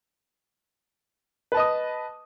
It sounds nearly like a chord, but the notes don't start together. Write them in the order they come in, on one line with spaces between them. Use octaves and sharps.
B4 A5 D#5 D#6